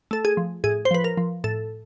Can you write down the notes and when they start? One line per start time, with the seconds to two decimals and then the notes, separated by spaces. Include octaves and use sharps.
0.11 A3 A4
0.25 G#4
0.37 F3
0.64 A2 G#4
0.85 C5
0.91 F3 B4
1.04 A#4
1.17 F3
1.44 A2 A4